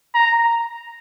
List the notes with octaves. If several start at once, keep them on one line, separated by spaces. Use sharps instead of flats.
A#5